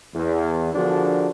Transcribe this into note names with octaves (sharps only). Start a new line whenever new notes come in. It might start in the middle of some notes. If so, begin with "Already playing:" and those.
E2
D3 F3 D4 F#4 G#4 A#4